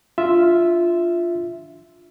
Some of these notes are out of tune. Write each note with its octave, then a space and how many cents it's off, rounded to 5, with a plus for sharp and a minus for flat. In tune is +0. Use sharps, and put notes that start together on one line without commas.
D4 +0 F4 -5 E5 +0